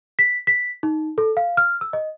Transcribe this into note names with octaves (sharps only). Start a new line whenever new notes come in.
B6
B6
D#4
A4
F5
F6
E6
D#5